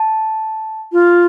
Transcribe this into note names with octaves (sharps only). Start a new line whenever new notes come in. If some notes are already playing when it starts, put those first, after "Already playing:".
Already playing: A5
F4